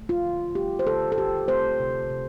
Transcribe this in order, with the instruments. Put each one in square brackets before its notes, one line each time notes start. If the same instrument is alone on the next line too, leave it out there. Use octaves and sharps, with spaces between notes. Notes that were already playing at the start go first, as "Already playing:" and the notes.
Already playing: [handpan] A3
F4
D3
A3 G4
C5
D3 A4
A4
A3 G4
A3 C5
C3
C3